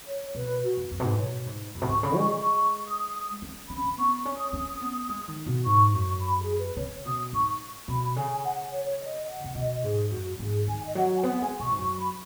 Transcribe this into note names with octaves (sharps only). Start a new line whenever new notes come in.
C#5
B2 B4
F#4
F#2
F#2
G#2 B2 B4
B2 C#5
G#2
F#2 B5
B2
G#2 C#6
C#3 B5
G#3 C#6
C#6
D#6
C#4
C#4 B5
C#4
B3 C#6
C#6
C#4
D#6
C#4
B3
G#3
D#3
B2
G#2 C#6
F#2 C#6
B5
G#4
B4
C#3 C#5
B2 D#6
G#2 C#6
B2 B5
C#3 G#5
F#5
C#5
C#5
D#5
F#5
C#3
B2 D#5
G#2 G#4
F#2 F#4
G#2 G#4
D#3 G#5
D#5
F#3 F#5
G#5
B3 F#5
G#3 G#5
B2 C#6
G#2
F#2 C#6
B5